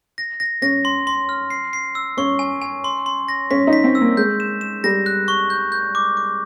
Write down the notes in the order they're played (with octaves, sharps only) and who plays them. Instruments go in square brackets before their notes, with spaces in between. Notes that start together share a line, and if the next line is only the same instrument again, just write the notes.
[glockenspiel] A#6
A#6
[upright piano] C#4 [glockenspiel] A#6
[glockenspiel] C6
C6
F6
C7
C7
E6
[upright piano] C#4 [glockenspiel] C#6
[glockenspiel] G#5
G#5
C6
C6
A#6
[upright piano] C#4 [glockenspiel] B6
[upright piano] D#4
[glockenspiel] B6
[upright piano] C4
[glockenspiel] E6
[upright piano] A#3
[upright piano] G#3 [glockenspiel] G6
[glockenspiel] E7
E7
[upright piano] G3 [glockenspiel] A#6
[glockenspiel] F#6
C#6
G6
G6
D6
D6